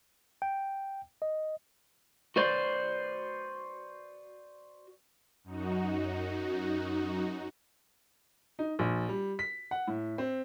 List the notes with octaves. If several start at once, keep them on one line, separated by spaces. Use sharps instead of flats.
G5
D#5
F#4 B4 C5 D5
F#2 D#4 F#4
D#4
A#1
G3
B6
F#5
A2
C4